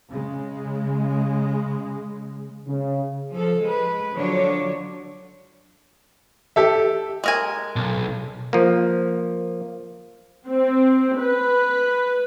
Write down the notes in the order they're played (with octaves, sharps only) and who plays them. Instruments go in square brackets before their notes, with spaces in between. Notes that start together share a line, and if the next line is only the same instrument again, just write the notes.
[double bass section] C#3 G#3
[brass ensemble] C#3
[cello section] F3 A4
G#3 B4
D3 F3 F#3 D4 C#5
[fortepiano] G4 A4 E5
[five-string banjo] G#3 A#4 G#5
[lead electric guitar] B1
[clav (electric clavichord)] F3 A#3
[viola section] C4
B4